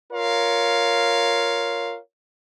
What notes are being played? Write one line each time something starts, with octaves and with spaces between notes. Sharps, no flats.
F4 A#4 C#5 F5